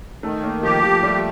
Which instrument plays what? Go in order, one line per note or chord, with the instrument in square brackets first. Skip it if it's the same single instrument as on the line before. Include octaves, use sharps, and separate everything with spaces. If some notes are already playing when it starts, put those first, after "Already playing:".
[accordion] D#3 [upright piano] A3
[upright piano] A#3
[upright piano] F3 [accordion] G4
[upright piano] F3
[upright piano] G3 [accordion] A3